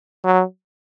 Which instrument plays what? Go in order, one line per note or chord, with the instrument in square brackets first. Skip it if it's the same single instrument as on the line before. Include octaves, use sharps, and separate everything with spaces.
[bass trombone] F#3